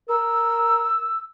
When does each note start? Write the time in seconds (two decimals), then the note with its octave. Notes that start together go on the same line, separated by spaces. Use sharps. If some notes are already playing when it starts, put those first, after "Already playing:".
0.09 A#4 E6